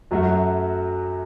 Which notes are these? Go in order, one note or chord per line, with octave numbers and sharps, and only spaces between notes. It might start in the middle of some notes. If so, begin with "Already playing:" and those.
F#2 F#3 A3 F#4